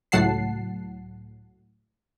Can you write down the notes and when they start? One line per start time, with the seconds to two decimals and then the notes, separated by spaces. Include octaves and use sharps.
0.12 C#2 A2 F#3 F#5 A5 C7